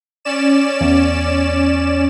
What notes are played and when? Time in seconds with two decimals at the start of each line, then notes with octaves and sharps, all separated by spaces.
0.25 C#4 D5 E7
0.81 E2